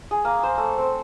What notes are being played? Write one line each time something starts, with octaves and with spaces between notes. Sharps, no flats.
G#4
A#3
C5
A3
C4